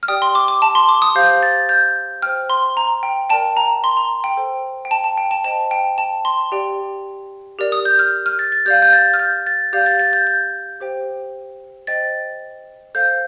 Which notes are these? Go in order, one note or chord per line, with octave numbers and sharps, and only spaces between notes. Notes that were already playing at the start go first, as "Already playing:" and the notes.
F6
G4 D5 G5 D#6
C6
D6
D6
A5
C6
D6
D#6
G4 C5 F5 G6
A6
G6
C5 G5 F6
C6
A#5
G5
A#4 D5 G5 A5
A#5
C6
A#5
G5
A4 C5 G5
G5
A5
A5
G5
A5
C5 D#5 G5 A5
G5
A5
C6
G4 D5 G5
G4 A#4 D5
D#6
G6
F6
F6
A6
A6
G4 D5 F5 G6
G6
A6
F6
G6
A6
G4 D5 F5 G6
A6
A6
G6
G6
G4 C5 G5
C5 D#5 G5 A6
A4 C5 F5 G6